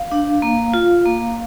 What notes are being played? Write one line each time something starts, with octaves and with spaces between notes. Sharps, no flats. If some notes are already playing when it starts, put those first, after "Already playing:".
Already playing: F5
D4
A#3
F4
A#3